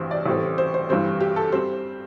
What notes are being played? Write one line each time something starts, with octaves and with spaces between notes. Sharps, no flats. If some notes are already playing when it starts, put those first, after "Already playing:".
Already playing: A1 G2 G3 C4 C5
D5
A1 A2 G3 C4
C5
C5
G2 E3 G3 C4 C5
G4
A4
G3 C4 C5